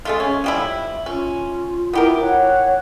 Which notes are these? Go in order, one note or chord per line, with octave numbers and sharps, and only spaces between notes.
G#3 A3 F4
C#4
F3 G3 E4
C#4 F4
B3 E4 G4 A#4
C#5 F#5